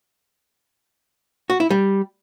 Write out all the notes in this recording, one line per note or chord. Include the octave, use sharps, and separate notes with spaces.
F#4
E4
G3